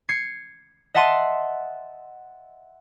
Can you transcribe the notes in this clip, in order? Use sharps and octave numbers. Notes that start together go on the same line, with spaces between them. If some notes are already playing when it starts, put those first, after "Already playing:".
G#6 C7 C#7
D#5 E5 F#5 A5 C6 D#7